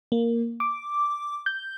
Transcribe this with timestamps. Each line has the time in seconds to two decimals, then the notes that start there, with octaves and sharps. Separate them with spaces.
0.12 A#3
0.60 D6
1.46 G6